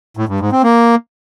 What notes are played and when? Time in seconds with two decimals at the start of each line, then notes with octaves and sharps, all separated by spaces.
0.17 A2
0.29 G2
0.40 G#2
0.52 C4
0.64 A#3